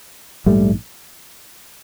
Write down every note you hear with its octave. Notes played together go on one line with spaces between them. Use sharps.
A#1 G#2 G3 A3